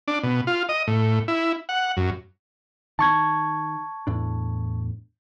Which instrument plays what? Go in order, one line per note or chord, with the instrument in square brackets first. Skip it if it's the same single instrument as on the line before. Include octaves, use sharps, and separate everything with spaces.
[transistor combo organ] D4
B2
F4
D#5
A2
E4
F#5
F#2
[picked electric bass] D#3 [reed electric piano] A5 C#6 G#6
[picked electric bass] E2 A2 D4